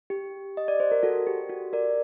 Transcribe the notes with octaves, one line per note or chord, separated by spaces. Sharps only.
G4
D#5
D5
C5
A#4
F#4 A4
G4
F#4
A#4 D5